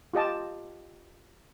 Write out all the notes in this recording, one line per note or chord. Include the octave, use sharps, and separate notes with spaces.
F4 G4 D#5 A5